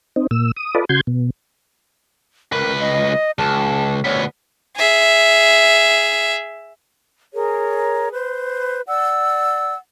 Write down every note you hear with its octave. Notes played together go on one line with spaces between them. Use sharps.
C4 D#4
A#2 E6
D#6
F4 A4 B4 D5 D#5
C#3 F#4 C6 G6 G#6
B2
C#2 A#4 B4
D#5
C#2 A5
D2 B3 C#5
G#4 E5
G#4 A#4 C#5
B4 C5
D5 F#5 E6